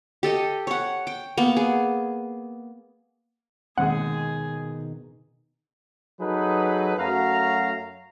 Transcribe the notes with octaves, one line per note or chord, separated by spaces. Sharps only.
G4 A4 D#5
C#5 F#5
G5
A#3 B3
G#4
D#2 G#2 B2 D#3 C4 G#4 F#5
F#3 D#4 G#4 A4 B4
F#2 F#3 A3 F#4 F5 A#5